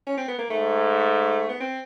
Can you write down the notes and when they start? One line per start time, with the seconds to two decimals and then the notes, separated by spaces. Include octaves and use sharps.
0.07 C#4
0.17 C4
0.28 B3
0.38 A#3
0.50 G#2 A3
1.49 B3
1.60 C4